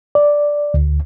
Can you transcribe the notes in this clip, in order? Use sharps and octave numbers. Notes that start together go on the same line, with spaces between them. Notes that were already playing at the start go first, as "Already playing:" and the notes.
D5
D2